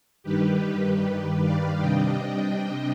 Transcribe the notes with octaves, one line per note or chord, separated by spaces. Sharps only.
G2 D#3 G3 G4 B4
D5 F5
C3 G3 D4 D#5 G5